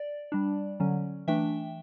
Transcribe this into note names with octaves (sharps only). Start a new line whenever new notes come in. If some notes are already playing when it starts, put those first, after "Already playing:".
Already playing: D5
G3 D4
D3 F#3 C#4
E3 A3 D4 E5 G5